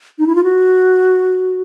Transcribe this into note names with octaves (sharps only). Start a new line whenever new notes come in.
D#4
E4
F4
F#4